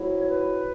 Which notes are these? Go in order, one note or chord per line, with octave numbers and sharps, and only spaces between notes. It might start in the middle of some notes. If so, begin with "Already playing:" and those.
Already playing: G#2 F#3 E4
C#5
B4